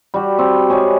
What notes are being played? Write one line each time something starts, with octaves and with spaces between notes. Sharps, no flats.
G3 F#4 B5
C4
G3 G#3 G#4 C#5